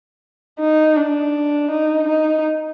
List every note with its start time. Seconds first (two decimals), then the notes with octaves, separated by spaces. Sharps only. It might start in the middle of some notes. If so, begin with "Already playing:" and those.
0.59 D#4
0.96 D4
1.71 D#4
2.08 D#4